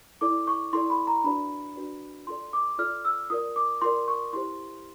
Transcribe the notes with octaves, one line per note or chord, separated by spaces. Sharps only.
E4 A4 D5 D6
C#6
E4 A4 D5 C6
B5
A#5
D4 F#4 B4 D5 B5
D4 F#4 B4 D5
F4 A4 D5 C6
D6
F4 A4 D5 F6
E6
F4 A#4 D5 D#6
D6
F4 A#4 D5 C6
C#6
E4 G4 C5 C6